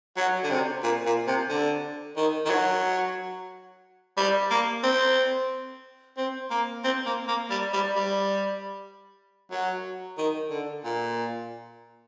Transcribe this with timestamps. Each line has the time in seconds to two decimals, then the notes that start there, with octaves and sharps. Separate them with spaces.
0.17 F#3
0.43 D3
0.50 C3
0.83 A#2
1.06 A#2
1.27 C3
1.49 D3
2.17 D#3
2.46 D#3
2.50 F#3
4.17 G3
4.50 A#3
4.83 C4
6.17 C4
6.50 A#3
6.84 C4
7.06 A#3
7.28 A#3
7.50 G3
7.73 G3
7.95 G3
9.51 F#3
10.18 D#3
10.50 D3
10.84 A#2